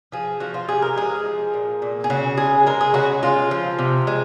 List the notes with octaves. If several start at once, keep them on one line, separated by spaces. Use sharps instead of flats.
F3 G#4
F3 F#4
F4
C3 G#4
A#4
G#3 G#4
F3
A#2
A#2
G#4
C#3 F#4
G#3 G#4
G#3 A#4
G#4
C#3 F#4
G#3 F4
F3
C3
G#3